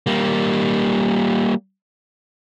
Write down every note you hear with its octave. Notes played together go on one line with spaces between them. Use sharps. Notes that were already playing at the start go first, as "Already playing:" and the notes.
G3 A#3